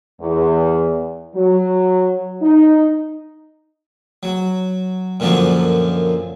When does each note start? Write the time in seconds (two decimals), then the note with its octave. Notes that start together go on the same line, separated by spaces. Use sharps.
0.20 E2
1.35 F#3
2.41 D#4
4.23 F#3
5.20 F#2 A#2 D3 F3 F#3